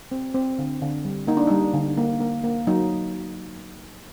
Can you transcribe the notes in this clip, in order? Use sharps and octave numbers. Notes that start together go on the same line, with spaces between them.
C4
C4
D3
D3
G3
A#3 D#4
D4
G3 D#4
D3
A#3
A#3
A#3
F#3 D#4